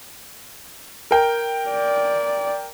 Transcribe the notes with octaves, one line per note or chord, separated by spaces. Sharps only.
A#4 G5
D5